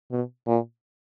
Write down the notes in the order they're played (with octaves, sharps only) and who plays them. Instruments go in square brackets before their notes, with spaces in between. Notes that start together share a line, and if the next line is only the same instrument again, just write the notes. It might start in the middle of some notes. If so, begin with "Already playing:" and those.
[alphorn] B2
A#2